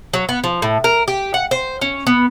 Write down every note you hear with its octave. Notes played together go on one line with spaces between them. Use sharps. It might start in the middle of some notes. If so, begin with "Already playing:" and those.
F#3
B3
F3
A2
A#4
G4
F#5
C5
C#4
B3